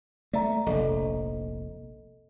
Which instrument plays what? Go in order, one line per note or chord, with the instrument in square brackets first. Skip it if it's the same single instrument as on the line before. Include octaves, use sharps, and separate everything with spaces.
[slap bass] A3 [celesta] D5 E5 A#5
[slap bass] F1 A#1 [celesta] A4 D#5